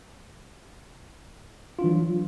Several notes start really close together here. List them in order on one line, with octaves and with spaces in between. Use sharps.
F4 D4 E3 F#3